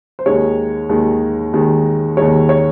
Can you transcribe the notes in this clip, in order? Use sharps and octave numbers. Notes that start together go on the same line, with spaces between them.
C5
D#2 D#3 G#3 C#5
D#2 D#3 G#3
D#2 D#3 G#3
D#2 D#3 G#3 C#5
C#5